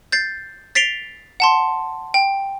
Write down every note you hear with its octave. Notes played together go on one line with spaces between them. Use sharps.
G6 A6 C7
A6 B6 C7 D7 F7 G7
F#5 A5 C6
G5